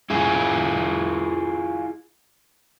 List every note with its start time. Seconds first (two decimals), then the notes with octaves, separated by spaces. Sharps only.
0.10 E4 F4 G#4